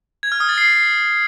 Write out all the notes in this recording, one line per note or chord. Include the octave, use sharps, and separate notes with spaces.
G#6
F6
D#6
A6
C7